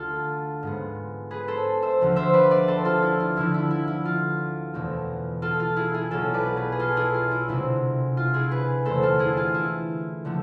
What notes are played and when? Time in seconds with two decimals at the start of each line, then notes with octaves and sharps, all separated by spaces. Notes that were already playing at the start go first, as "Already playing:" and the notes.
Already playing: D2 D3 A3 F4 A4
0.63 G#2 G#3 B3
1.31 G#4 B4
1.48 A4 C5
1.82 C5 E5
1.99 D2 D3 F3 A3
2.16 C5 E5
2.34 B4 D5
2.51 B4 D5
2.68 A4 C5
2.85 F4 A4
3.02 E4
3.20 F4
3.36 D2 D3 F3 E4
3.54 E4
3.71 E4
3.88 E4
4.05 F4
4.74 E2 B2 A3 C4
5.42 F4 A4
5.60 F4
5.76 E4 G#4
5.94 E4 G#4
6.11 B1 B2 B3 F4 A4
6.34 B4 D5
6.57 G#4 B4
6.72 G#4
6.79 F4 A4
6.96 E4 G#4
7.14 F4
7.31 E4
7.48 D2 C3 G#3 C4 E4
8.17 F4
8.34 E4 G#4
8.51 G#4 B4
8.85 E2 D3 A3 C4 A4 C5
9.03 F4 A4
9.19 E4 G#4
9.37 F4
9.54 E4
10.25 D3 F3 A3